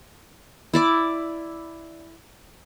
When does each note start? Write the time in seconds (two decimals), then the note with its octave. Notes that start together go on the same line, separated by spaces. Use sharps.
0.74 E4 D5 D6